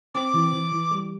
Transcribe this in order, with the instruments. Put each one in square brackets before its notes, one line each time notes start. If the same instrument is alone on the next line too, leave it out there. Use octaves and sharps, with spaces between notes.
[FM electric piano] C4 [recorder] D6
[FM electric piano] E3
E3
E3
G3